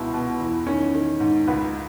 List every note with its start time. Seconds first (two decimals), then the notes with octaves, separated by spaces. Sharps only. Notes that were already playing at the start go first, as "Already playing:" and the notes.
Already playing: C#2 B2 E4
0.14 B2
0.40 E2
0.66 D#3 C#4
0.94 D#3
1.20 G#2
1.47 C#2 B4